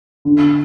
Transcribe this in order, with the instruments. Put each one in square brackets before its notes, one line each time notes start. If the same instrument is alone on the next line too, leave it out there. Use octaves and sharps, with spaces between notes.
[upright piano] D3